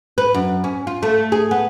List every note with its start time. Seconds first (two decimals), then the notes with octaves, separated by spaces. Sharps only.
0.18 B4
0.34 F#2
0.64 C#4
0.87 F4
1.03 A3
1.32 G#4
1.51 B3